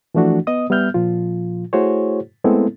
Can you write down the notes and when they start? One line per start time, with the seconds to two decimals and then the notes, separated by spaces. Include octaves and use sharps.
0.15 E3 F3 A3 D4 F#4
0.47 B3 D#5 D#6
0.70 G3 B3 E5 F6 G6
0.94 A#2 F3 F4
1.73 A3 E4 F#4 G#4 C5 C#5
2.45 G#3 A3 B3 C4 E4 A4